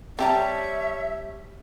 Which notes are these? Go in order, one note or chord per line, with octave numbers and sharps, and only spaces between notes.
G3 C4 G4 C#5 E5 A5 A#5